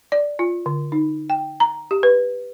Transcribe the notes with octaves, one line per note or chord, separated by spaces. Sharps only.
D5
F4
D3
D#4
G5
A#5
G4
B4